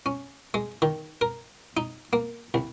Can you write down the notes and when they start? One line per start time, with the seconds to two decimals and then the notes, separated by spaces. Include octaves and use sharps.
0.06 C#4
0.54 G#3
0.82 D#3
1.21 A#4
1.77 D#4
2.13 A#3
2.54 C2